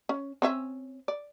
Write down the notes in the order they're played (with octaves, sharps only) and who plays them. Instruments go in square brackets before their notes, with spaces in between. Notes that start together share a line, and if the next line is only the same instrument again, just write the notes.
[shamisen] C#4
C4 C#4 E5
D5